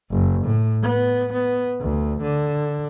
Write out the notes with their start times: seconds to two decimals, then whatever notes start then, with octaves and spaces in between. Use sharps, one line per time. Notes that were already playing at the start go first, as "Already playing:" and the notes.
0.11 F#1
0.45 A2
0.82 B3
1.33 B3
1.80 D2
2.21 D3